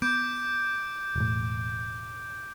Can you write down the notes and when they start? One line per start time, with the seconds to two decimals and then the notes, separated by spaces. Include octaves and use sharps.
0.02 B3 D6 G6 D7
1.16 E1 A2